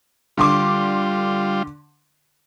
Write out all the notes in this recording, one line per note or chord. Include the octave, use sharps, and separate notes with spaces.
D3 G3 F4 C6 D6